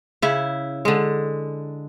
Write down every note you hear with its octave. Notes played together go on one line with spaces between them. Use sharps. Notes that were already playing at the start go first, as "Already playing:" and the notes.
C#3 E4
D3 G#3